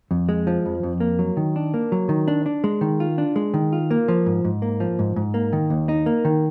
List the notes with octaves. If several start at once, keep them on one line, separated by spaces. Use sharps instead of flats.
F2
G#3
F3
F2
F2
A#3
F#3
D#3
D4
A#3
F#3
D#3
D4
D4
G#3
D#3
F4
D4
G#3
D#3
F4
A#3
F3
G#2
G#2
A#3
F3
G#2
G#2
A#3
D#3
D#2
D#4
A#3
D#3